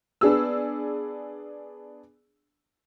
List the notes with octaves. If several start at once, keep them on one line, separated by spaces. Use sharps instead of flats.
B3 D4 G#4 E6